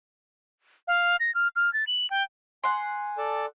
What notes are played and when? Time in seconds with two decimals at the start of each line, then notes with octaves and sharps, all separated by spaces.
0.88 F5
1.20 A#6
1.35 F6
1.56 F6
1.73 A6
1.87 F#7
2.10 G5
2.64 F#5 G#5 C6
3.18 A4 D5 A5